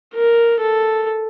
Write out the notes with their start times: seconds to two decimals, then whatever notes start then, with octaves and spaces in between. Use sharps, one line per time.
0.14 A#4
0.60 A4